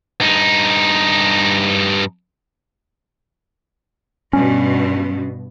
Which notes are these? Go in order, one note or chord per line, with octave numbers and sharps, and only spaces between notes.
G2 D#4
G2 B2 C#4